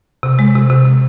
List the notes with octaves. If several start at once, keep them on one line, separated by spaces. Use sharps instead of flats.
C3
G#3
C3
C3
C3